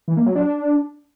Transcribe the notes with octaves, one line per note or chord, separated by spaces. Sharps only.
E3
A#3
F#3
D4